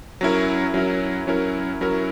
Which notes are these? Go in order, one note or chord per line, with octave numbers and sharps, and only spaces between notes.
F#3 C#4 E4 A#4
F#3 C#4 E4 A#4
F#3 C#4 E4 A#4
F#3 C#4 E4 A#4